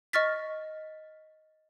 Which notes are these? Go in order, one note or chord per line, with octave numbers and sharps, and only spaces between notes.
D#5 C#6 F6 A6 B6